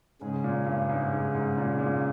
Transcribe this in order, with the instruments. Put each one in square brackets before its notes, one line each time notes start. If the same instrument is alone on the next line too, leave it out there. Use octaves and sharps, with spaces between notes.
[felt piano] G#2 [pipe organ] C#3 G#3 C#4 G#4
[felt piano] A#2
G2
G#2
G#2
G#2
A#2
G#2
A#2